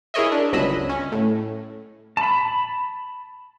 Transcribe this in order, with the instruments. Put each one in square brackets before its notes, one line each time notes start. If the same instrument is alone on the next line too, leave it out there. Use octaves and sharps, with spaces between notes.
[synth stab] E4 G#4 A#4 C#5 D#5 E5
D4
G1 C#2 F#3 D#5 B5 E6
C#4
A2
[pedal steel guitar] A5 B5